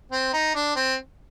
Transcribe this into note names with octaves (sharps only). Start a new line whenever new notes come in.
C4
D#4
D4
C4